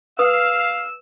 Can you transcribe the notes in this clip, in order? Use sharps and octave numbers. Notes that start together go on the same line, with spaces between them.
B4 F5 D#6 E6